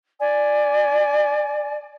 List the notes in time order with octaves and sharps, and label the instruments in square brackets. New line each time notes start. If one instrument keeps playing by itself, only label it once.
[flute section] D5 G#5